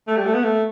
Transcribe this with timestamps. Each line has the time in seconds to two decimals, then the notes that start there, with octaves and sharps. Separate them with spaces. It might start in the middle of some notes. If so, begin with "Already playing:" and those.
0.07 A3
0.17 G3
0.25 A3
0.34 B3
0.44 A3